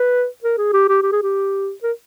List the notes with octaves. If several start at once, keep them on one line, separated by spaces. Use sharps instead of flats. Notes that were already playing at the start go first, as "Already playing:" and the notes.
Already playing: B4
A#4
G#4
G4
G4
G4
G#4
G4
A#4